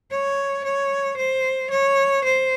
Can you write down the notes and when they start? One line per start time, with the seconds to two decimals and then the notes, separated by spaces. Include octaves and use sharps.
0.11 C#5
0.64 C#5
1.17 C5
1.70 C#5
2.24 C5